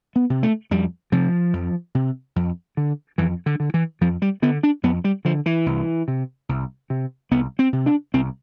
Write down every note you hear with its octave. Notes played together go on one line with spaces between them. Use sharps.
B3
C3
A3
F2 G3
C3 F3
F2
C3
F2
D3
F2 E3
D3
D3
E3
F2 F3
G3
D3 B3
D4
F2 B3
G3
D3 F3
E3
C2
C3
C2
C3
C2 B3
C4
C3
D4
C2 C4